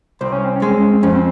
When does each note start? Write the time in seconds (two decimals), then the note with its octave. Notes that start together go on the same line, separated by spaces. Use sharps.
0.21 C2 C4
0.32 C#4
0.45 C4
0.56 C#4
0.62 G#3
0.68 C4
0.80 C#4
0.92 C4
1.03 F2 C#4
1.15 C4